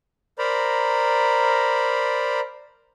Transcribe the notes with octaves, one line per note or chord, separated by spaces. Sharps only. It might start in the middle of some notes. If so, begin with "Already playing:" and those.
A#4 C5 D5 A#5 B5